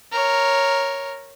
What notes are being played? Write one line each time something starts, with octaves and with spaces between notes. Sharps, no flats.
A#4 C#5